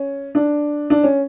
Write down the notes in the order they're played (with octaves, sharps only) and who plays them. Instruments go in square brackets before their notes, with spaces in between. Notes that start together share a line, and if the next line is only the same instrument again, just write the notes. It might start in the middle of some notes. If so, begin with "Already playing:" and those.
Already playing: [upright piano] C#4
D4
D4
C#4